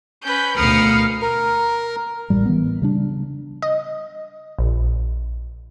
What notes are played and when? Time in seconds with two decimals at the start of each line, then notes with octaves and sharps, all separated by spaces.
0.24 C#4 B4 G6
0.56 D2 B2 A#4 F5 B5 D#6 F6 C#7
1.22 A#4
2.30 A1 A2 G3
2.45 E3 B3
2.82 C#3 G3 D4
3.62 D#5
4.59 A#1